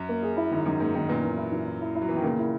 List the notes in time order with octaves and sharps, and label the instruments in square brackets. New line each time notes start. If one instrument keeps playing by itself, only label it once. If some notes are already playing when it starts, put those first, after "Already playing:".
Already playing: [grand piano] F#2
[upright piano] A#3
G#4
E4
[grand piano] G#2 [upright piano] D#3
[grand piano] F#2 [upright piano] D#3
[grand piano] G#2 [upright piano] A#3
[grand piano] G#2 [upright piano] D#3
[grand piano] F#2 A#2 [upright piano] B3
[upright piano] E3
E4
E3
E4
E4
E4
[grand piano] F#3
[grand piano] E3 [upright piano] B3
[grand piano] D#3
[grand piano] A#2 C#3 [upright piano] A#3
[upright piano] E4